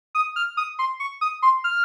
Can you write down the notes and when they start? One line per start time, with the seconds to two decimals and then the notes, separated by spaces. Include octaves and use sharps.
0.15 D#6
0.36 F6
0.57 D#6
0.79 C6
1.00 C#6
1.21 D#6
1.42 C6
1.64 F6